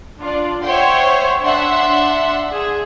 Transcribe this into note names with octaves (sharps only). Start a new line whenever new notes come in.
D4 F4 D5
C5 C#5 E5 F#5 G5 C6
D4 E5 F#5 C6
G#4